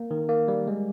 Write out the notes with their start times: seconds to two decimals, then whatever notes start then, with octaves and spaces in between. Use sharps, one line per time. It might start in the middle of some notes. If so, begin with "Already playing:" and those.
Already playing: A#3
0.11 D#3
0.29 A#3
0.48 G3
0.67 G#3